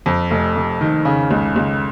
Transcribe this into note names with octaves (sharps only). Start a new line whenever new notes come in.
F2
F1
F1
D#3
C#3
C#2
C#2